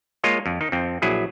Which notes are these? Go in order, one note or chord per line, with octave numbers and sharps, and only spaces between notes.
G#3 A#3 F4 C#5 D#5
F2
D#3 D#4
F2 C4
A#1 F#3 E4 G#4